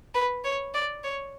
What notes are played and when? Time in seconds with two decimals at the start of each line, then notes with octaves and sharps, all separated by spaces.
0.14 B4
0.44 C#5
0.74 D5
1.04 C#5